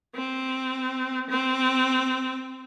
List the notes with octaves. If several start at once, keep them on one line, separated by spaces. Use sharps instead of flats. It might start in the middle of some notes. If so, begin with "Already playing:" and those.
C4
C4